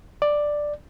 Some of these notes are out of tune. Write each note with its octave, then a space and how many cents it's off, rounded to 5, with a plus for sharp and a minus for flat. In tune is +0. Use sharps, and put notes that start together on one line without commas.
D5 +5